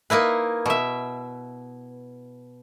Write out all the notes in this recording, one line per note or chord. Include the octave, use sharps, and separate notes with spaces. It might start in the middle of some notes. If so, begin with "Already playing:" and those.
A#3 D#4 E4 B4
B2 E5